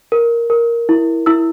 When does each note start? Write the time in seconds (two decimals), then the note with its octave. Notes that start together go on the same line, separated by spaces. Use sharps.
0.12 A#4
0.50 A#4
0.89 E4
1.26 E4 E6